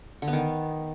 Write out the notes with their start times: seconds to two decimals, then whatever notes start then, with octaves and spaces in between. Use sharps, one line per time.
0.22 D3
0.28 B3
0.33 D#3